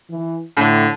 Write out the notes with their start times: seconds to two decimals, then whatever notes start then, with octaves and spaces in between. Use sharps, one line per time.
0.10 E3
0.57 A2 D3